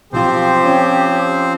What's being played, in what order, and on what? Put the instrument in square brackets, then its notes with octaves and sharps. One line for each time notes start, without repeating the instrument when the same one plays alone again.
[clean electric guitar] B1 F4 [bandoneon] F3 C4 C5 [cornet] G4
[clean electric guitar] C#4